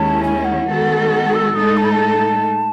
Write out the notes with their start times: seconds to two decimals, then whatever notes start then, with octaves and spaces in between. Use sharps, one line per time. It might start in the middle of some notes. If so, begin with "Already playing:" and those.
Already playing: D#2 D#3 G#3 C#4 E4 A5
0.23 G#5
0.45 F#5
0.67 D#3 G#3 B3 F#4 A4
1.11 F#5
1.34 E6
1.55 A2 G#3 D#4 A4 D#6
1.77 A5
1.84 B5
1.92 A5